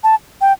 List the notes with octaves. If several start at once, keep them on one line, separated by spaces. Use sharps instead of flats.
A5
G5